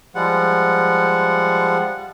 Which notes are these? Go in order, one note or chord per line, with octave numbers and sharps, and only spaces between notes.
F3 G3 G#3 F#5